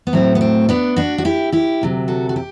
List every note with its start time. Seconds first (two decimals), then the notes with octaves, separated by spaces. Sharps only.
0.07 B3
0.13 A2 F#3 A3 C4
0.35 B3
0.41 C4
0.69 B3 D4
0.96 D4 F#4
1.18 F#4
1.25 E4 G4
1.52 E4 G4
1.81 D2 C3 F#3
2.08 F#4 A4
2.29 F#4
2.36 G4